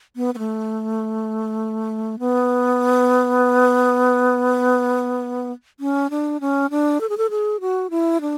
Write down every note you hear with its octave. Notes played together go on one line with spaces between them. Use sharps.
B3
B3
A3
B3
C#4
D4
C#4
D4
A4
G#4
A4
G#4
F#4
E4
D4